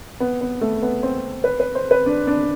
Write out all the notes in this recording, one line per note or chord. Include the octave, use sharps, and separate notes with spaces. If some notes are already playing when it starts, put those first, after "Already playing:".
B3
B3
A3
B3
C4
B4
B4
C5
B4
D4
D4